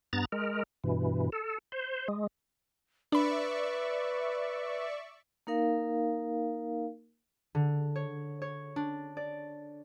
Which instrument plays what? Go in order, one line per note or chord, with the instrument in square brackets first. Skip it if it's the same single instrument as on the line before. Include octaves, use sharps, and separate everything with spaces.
[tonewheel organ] G2 B3 A#5 A6
G#3 A#4
G2 B2 E3
A4
C5
G#3
[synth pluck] D4 B5 [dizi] B4 [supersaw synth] D5 E5 C#6
[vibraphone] A#3 D#4 A#4 F5
[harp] D3
C#5
C#5
D4
D5